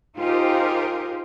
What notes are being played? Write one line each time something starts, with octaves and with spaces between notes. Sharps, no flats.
D#4 F4 G4 G#4 A#4 C5